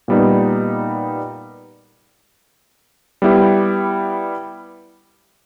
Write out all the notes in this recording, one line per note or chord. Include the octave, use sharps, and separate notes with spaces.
A#2 G3 B3 D#4
G3 B3 E4 G4